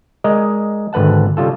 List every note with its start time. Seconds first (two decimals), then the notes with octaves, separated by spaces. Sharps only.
0.24 G#3 A#4 D5 D#5
0.93 G#1 D3 B4 F#5 A5
1.37 C#3 G3 F4 A4